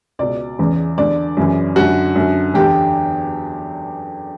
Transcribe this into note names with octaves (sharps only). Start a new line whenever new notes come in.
C#2 B2 D5
E2 C#3 E3
E2 D3 D5
F#2 C#3 E3
F#2 D3 F#4
F#2 D3
E2 D3 G4